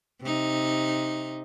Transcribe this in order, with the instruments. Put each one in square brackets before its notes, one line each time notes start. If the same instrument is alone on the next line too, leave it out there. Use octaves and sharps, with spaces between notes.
[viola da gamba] C3 D#4